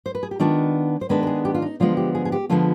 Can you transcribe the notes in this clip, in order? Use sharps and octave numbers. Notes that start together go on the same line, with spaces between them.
C5
B4
G#4
G4
D#3 G#3 B3 D4 F4
C5
D#3 G#3 B3 D4 B4
B4
G#4
G4
F4
D#4
D3 F3 G#3 B3 F4
G4
G#4
G#4
G4
D3 F3 G#3 B3 F4